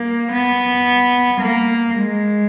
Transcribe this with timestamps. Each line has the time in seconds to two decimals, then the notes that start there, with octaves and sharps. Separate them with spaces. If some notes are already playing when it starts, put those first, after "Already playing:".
Already playing: A#3
0.32 B3
1.40 A#3
1.95 G#3